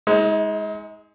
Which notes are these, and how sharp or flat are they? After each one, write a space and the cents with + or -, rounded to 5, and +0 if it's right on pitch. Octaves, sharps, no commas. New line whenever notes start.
G#3 +0 D#4 +40